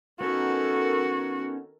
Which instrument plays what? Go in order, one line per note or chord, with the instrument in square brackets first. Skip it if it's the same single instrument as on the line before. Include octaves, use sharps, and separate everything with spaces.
[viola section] D#3 A4 A#4 [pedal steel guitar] B3 C#4 D#4 [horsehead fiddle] F#4